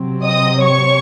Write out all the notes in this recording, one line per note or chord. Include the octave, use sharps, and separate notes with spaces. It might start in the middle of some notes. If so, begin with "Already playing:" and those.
Already playing: C3 F#3 C4
D#5 D#6
C#5 C#6